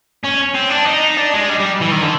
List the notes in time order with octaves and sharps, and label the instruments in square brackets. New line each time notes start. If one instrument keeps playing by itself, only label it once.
[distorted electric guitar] C#4
C4
D4
D#4
D4
G#3
G3
G3
E3
D#3
D3